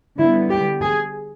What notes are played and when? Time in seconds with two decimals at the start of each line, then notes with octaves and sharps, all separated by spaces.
0.17 D3 G3 B3 E4
0.50 G4
0.82 G#4